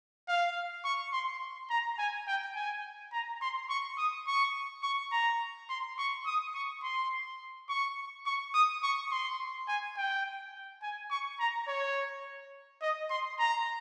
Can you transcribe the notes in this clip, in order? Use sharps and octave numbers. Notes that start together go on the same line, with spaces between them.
F5
C#6
C6
A#5
G#5
G5
G#5
A#5
C6
C#6
D#6
C#6
C#6
A#5
C6
C#6
D#6
C#6
C6
C#6
C#6
D#6
C#6
C6
G#5
G5
G#5
C#6
A#5
C#5
D#5
C6
A#5